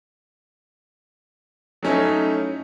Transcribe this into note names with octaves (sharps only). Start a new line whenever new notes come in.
F#3 A3 C#4 D#4 E4